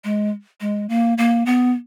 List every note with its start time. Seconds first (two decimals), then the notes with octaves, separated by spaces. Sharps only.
0.04 G#3
0.61 G#3
0.89 A#3
1.18 A#3
1.46 B3